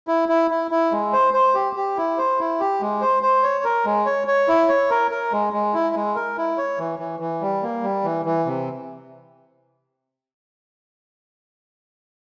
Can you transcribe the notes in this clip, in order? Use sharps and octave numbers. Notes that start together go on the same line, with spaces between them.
E4
E4
E4
E4
G#3
C5
C5
G4
G4
E4
C5
E4
G4
G#3
C5
C5
C#5
A#4
G#3
C#5
C#5
E4
C#5
A#4
A#4
G#3
G#3
E4
G#3
A#4
E4
C#5
E3
E3
E3
G3
A#3
G3
E3
E3
C3